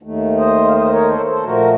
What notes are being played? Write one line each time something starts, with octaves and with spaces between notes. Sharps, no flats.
D#2 D#3 A3
C5 D#5
F5
C5 D#5
C5
A#4 C#5
A4 C5
A4 C5
A#2 F3 A3 F#4 A#4